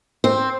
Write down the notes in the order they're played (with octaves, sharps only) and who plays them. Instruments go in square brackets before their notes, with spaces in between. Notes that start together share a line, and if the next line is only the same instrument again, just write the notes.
[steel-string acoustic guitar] C4